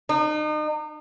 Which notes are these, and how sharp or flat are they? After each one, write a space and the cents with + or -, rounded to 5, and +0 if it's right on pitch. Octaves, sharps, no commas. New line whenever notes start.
D#4 -35